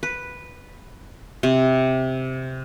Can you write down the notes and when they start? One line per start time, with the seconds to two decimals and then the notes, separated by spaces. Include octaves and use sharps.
0.03 B4
1.43 C3